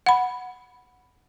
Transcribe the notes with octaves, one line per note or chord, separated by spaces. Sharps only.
F#5 B5